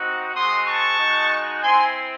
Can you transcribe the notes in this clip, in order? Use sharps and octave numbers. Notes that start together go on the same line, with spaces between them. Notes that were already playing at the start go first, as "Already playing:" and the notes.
Already playing: C4 D#4 F#4
G#3 C4 F#4 C6 D#6
A5 C#6
G#3 D#4 F#4
C4 E4 G#5 C6